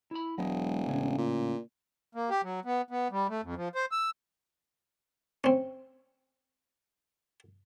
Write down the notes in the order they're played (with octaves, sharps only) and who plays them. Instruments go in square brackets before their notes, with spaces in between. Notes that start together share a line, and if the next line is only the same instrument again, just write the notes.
[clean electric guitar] E4 B5
[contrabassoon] E1 [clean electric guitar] F#3 G#3
[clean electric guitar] A2 C#3 C#4
[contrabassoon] A#2
[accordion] A#3
G4
F#3
B3
B3
G3
A3
F2
F3
C5
E6
[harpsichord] C4 C#4